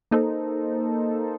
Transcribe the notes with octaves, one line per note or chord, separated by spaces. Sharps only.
A#3 D#4 A4 C5